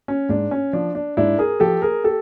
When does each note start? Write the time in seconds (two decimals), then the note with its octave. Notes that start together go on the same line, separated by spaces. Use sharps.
0.08 C#4
0.29 G#2 D4
0.51 C#4
0.73 F3 D4
0.95 D4
1.17 G#2 D4 E4
1.38 G#4 A#4
1.60 F3 G4 A4
1.82 G#4 A#4
2.04 G4 A4